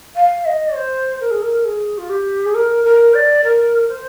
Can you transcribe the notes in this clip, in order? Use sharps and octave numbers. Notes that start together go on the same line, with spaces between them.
F5
D#5
C5
A#4
G#4
A#4
G#4
F4
G4
G#4
A#4
A#4
D5
A#4
C5